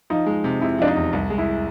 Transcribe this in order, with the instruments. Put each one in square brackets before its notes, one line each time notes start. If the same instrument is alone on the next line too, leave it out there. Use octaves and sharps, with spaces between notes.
[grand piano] F3 [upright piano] D#4
[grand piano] G#3
C3
[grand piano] C3 [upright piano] E4
[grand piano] F3 [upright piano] D4
[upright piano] D#4
[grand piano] E2
C2
G#3
[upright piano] E4